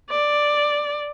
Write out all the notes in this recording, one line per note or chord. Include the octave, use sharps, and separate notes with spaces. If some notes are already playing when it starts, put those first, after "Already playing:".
D5